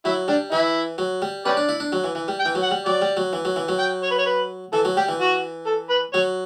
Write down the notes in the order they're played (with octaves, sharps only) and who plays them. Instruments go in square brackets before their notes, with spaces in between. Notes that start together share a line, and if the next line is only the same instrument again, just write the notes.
[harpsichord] F#3 [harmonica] E4
[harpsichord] G3 [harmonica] D4
[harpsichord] E3 [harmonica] E4
[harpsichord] F#3
G3
[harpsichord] C#4 [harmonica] G4 B4 D5
[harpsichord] D4
E4
D4
F#3
E3
E3
G3
[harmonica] G5
[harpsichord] E3
F#3
[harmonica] F#5
[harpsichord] G3
[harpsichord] F#3 [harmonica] D5
[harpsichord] G3
F#3
E3
F#3
E3
F#3
[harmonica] G5
C#5
B4
C#5
B4
[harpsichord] E3 [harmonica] A4
[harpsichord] F#3
[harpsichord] G3 [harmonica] G4
[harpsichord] E3
[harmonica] F#4
A4
B4
[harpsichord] F#3 [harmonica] C#5